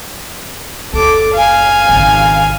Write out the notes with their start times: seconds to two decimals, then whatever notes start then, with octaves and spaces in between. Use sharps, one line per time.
0.93 F#1 D2 A4 D6
1.34 F5 G#5
1.89 G#1 C#3